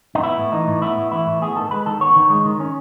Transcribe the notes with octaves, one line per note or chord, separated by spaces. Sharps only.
D#4
B3 E4
A2
E3 D#4
A2
B3 E4
A2
E3 E4
A2
B3 G#4
D#3 A4
G#3 B4
D#3 A4
B3 C#5
D#3
G#3
D#3
C#4